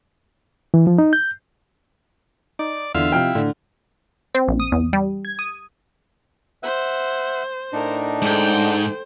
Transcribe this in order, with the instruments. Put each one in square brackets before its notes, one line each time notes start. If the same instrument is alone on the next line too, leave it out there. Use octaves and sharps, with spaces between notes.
[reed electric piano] E3
F3
D#4
G6
[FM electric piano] D#4 [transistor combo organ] D5
[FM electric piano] E2 [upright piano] D3 [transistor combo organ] F4 E5 F5
[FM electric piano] C3 F3 D#4 [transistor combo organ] E4 [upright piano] F5 G5 F6
[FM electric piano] A2 [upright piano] D3
[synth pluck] C4
A#1
D#6
E2
G3
G#6
D#6
[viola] C5 [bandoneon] E5 F#5
[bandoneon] A2 D4 D#4 [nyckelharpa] A#4
[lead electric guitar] G#2 [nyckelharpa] A4 G5 [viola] C5